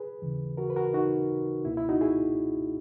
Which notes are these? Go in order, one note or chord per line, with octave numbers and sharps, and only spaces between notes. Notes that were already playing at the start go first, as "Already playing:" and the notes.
Already playing: G#4 B4
D#2 C#3 E3
F#4 A#4
B4
F#4 A#4
D#4 F#4
C#2 B2 A#3 E4
E4
D#4 F#4
E4 G#4